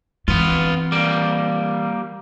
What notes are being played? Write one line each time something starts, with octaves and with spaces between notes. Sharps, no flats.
E3 B3 C4 F4
G3 A#3